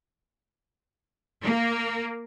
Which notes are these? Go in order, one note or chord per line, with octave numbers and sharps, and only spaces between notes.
A#3